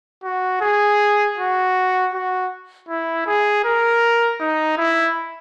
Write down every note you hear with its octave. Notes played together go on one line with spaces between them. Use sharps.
F#4
G#4
F#4
F#4
E4
G#4
A#4
D#4
E4